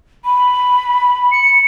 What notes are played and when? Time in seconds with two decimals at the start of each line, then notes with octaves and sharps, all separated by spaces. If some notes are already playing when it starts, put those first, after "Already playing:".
0.25 B5
1.31 C#7